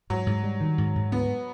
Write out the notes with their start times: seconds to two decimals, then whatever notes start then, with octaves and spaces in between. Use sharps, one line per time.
0.10 G#2 F#3
0.27 G#2
0.43 G3
0.61 D#3
0.78 G#2
0.96 G#2
1.12 D2 B3